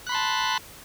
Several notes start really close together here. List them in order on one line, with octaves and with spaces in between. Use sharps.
F#6 B5 C6 A5